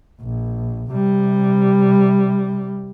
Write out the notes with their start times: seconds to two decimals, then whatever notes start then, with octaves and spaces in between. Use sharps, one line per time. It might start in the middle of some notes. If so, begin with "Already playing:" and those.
0.22 A#1
0.92 C3 G3